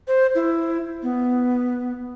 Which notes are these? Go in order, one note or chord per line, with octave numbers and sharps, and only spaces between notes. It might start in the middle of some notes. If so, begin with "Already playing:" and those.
C5
E4
B3